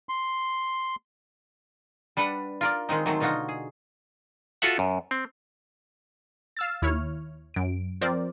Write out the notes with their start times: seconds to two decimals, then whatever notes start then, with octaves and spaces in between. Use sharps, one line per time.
0.09 C6
2.17 G3 D4 B4 F#5
2.61 F4 A#4 D5
2.89 D#3 G#3 C4 D#4
3.06 D#3 F#3 G#3 A3 C4
3.20 B2 D3 D#4 F4 F#4
3.49 G#4
4.62 F4 F#4 A4 E5 F#5
4.79 F#2
5.11 C4
6.57 F5 E6 A6
6.82 D#2 E4 C#5 F6
7.54 F#2 D7
8.01 F3 C4 A#4 C5 D5